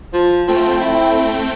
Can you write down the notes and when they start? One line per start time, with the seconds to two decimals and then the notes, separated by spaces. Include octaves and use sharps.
0.13 F3
0.48 F3 A3 C4 G5
0.81 E4